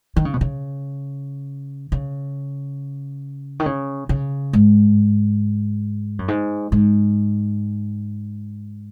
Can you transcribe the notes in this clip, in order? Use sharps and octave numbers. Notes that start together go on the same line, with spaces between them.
D#3
C#3
B2
C#3
C#3
D#3
C#3
C#3
G#2
F#2
G#2
G#2